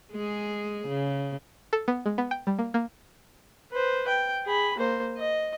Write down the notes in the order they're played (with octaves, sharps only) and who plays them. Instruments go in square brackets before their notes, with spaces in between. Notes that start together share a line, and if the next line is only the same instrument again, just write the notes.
[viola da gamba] G#3 G#4
C#3
[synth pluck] A4
B3
G#3
B3
G5
G3
A#3
A#3
[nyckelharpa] B4 C5
G5
G#4 B5
A#3 C5
D#5